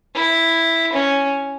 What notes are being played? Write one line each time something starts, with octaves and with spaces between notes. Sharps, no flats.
E4
C#4